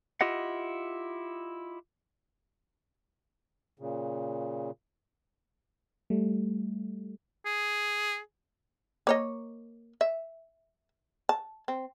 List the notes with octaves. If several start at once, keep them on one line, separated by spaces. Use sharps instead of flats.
E4 F4 G4 D#5 F#5
A#2 C#3
G3 A3
G#4
A#3 C#5 D#5
E5
A5
C4